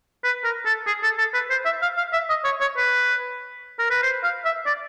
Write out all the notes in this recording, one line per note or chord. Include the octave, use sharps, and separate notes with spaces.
B4
A#4
A4
G#4
A4
A4
B4
C5
E5
F5
F5
E5
D#5
C#5
C#5
B4
A#4
B4
C5
F5
E5
D5